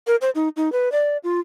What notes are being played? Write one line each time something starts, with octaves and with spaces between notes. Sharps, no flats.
A#4
C5
D#4
D#4
B4
D5
F4